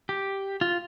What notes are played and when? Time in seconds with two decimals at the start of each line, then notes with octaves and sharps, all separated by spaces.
0.09 G4
0.61 F4